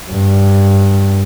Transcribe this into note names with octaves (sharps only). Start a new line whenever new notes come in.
G2